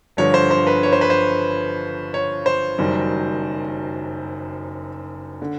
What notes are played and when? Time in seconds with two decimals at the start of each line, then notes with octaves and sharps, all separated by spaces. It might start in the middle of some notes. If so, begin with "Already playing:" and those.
0.17 G1 G2 D3 F3 C#5
0.34 C5
0.51 C5
0.67 B4
0.83 C#5
0.93 C5
1.01 B4
1.10 C5
2.14 C#5
2.46 C5
2.78 F#1 F#2 D#3 G3
5.42 D3